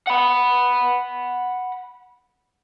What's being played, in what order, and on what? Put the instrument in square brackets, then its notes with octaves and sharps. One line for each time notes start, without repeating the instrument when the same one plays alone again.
[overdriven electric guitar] F#5 B5